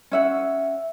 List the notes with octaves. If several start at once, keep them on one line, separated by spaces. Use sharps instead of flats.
C#4 E5 F#5